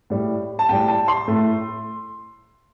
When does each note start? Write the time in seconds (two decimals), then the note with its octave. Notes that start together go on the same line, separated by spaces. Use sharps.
0.10 A2 G3
0.59 A5
0.69 A2 G3 G5
0.88 A5
1.08 C6
1.28 A2 A3